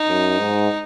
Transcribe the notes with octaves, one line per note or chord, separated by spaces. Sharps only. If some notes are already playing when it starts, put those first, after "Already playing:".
Already playing: D#4
F#2
G#2